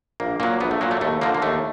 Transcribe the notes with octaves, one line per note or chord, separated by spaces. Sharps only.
A#1 A#3
A#2 F#3 A#3
A#1 B3
A3
A#2 F#3 A#3
A3
D#2 A3
D3 F3 A#3
A#3
D#2 A3